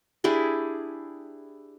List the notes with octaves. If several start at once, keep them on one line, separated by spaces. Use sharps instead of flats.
D4 E4 G4 G#4